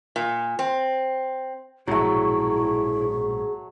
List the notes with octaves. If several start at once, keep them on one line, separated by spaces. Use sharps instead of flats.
A#2
C4
A#1 G#2 B2 F#3 A3 E4 G#4